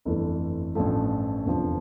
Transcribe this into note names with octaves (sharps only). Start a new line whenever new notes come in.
G1 F2 E3 A3
A1 G2 F3 A3
F1 E2 D3 F3